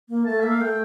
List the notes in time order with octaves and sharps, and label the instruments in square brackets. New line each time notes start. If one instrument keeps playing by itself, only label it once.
[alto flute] A#3
[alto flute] A3 [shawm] A5
[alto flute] A#3 [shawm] E5
[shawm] F5
[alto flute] A3 [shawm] G5